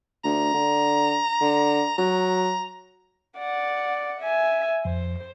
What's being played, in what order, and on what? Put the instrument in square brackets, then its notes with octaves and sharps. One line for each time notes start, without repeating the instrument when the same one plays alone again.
[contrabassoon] D2 [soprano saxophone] A#5
[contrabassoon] D3
D3
[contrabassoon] F#3 [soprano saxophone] A#5
[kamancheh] D5 F#5
E5 G#5
[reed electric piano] F2 [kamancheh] C5